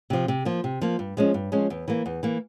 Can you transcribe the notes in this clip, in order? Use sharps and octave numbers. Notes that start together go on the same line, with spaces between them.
C3 F3
C3
F3 A#3
C3
F3 A#3
G2
F3 G#3 C#4
G2
F3 G#3 C#4
E2
E3 A#3
E2
E3 A#3